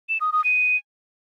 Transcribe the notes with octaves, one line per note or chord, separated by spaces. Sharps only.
E7
D#6
D#6
D#7